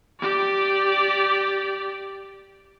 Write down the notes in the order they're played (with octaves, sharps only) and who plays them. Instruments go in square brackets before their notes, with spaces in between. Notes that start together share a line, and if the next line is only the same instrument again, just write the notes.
[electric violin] G4 D5